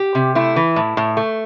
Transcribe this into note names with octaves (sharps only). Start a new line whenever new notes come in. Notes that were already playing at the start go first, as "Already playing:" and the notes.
Already playing: G4
C3
A3 E4
E3
A2
A2
A3